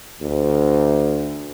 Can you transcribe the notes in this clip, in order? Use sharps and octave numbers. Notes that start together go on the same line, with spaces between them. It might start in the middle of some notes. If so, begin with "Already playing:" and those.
D2